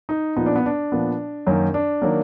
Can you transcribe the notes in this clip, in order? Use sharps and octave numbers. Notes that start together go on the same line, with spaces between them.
D#4
A#2 F3 B3 D#4
D4
B3
D4
A#2 F3 B3
F#2 D#3 F#3 A#3
D4
D#3 F#3 A#3